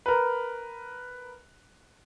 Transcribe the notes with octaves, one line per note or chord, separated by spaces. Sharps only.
A#4 B4